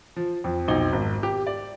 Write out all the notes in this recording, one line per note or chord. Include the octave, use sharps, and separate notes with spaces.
F3
F2 F3
B1 F2 D#4 G7
G#1
G4
D5